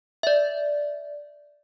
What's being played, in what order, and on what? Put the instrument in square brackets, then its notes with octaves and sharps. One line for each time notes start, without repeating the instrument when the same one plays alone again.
[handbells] D5 E5